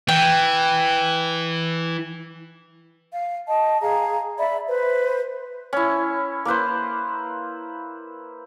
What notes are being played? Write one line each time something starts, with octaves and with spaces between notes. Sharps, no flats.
E3 G5
F5
D#5 A5
G#4 F5 A#5
D5 E5 B5
B4 C5
C#4 E4
A#3 E4 B4 C5